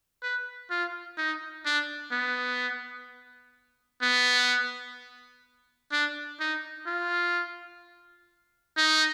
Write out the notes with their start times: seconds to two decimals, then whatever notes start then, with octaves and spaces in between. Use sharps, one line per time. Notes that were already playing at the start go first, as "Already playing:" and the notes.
0.23 B4
0.70 F4
1.18 D#4
1.65 D4
2.12 B3
4.02 B3
5.92 D4
6.40 D#4
6.87 F4
8.77 D#4